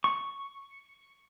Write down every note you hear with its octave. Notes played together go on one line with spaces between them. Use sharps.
C#6